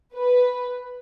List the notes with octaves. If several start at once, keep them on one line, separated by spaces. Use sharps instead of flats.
B4